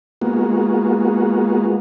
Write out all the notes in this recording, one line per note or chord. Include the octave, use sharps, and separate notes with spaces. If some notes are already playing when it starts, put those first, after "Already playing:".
G#3 A#3 B3 F4 F#4